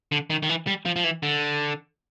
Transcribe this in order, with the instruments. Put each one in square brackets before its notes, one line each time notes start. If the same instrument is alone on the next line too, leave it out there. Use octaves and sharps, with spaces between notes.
[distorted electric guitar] D3
D#3
D#3
E3
G3
F3
F3
E3
D3